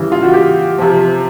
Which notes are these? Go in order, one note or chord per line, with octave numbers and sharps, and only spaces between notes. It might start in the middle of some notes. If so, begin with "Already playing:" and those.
Already playing: C#3 E3 G3
F4
F#4
G4
C3 F3